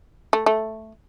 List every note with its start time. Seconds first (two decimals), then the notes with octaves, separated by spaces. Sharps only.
0.33 A3
0.46 A3